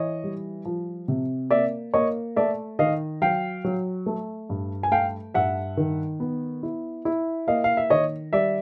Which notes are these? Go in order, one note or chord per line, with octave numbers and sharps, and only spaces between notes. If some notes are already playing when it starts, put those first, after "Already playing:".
Already playing: E3 C#5 D#5
G3
F3
C3
A#3 D5 E5
A#3 C#5 D#5
A3 D5 E5
D#3 D#5 F5
F#3 F5 G5
F#3
A3
G2
G#5
A3 F5 G5
G2 E5 F#5
D#3
B3
E4
E4
A#3 D#5 F5
F5
E5
D#3 C#5 D#5
G3 D5 E5